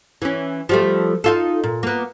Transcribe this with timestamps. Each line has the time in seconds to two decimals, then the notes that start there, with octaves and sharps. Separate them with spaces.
0.22 E3 C#4
0.69 F3 G3 A3
1.24 D#4 F4 A4
1.64 A#2
1.83 A#3 B3